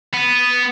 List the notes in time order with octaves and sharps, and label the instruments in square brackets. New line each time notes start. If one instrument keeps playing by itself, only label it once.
[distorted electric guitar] B3